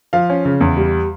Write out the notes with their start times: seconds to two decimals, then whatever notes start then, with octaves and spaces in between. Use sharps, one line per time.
0.13 F3 F5
0.30 C#4
0.45 C#3
0.61 E2
0.77 G3